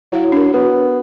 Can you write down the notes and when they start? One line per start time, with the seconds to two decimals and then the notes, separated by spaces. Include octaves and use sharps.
0.12 F#3 E4 C#5 F5
0.32 D4 A#4
0.54 B3 F#4